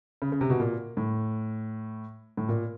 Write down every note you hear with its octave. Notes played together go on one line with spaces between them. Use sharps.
C#3
C#3
C3
B2
A#2
A2
A2
A#2